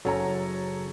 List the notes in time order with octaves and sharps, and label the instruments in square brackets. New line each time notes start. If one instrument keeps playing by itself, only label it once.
[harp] F#1 [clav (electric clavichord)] F#3 C#4 [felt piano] A4 C#5 A#5